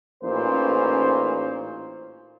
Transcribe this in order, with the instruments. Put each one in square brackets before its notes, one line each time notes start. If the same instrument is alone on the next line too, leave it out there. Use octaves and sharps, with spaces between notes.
[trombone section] A1 A#2 E3 C#4 D#4 C5